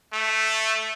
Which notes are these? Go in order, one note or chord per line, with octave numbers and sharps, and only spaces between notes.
A3